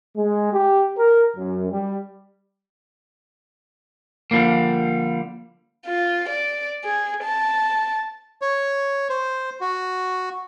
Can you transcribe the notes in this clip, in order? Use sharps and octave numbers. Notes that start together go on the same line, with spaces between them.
G#3
G4
A#4
F#2
G3
D3 F3 G3 A#3
F4
D5
G#4
A5
C#5
C5
F#4